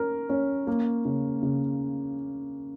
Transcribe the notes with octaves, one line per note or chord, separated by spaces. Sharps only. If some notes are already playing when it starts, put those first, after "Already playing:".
Already playing: C#4 A#4
C#4
A#3
C#3
C#3